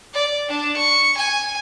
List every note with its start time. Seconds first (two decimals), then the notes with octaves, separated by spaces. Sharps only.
0.14 D5
0.48 D4
0.77 C#6
1.17 G#5